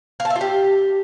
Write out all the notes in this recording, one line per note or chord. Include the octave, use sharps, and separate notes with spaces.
F5
A5
E5
F4
G4